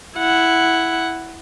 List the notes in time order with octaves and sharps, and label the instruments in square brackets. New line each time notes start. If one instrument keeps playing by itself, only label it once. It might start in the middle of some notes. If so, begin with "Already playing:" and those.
[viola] E4 F#5